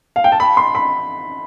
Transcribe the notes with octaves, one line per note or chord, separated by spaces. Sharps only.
F5
G5
A5
B5
C6
B5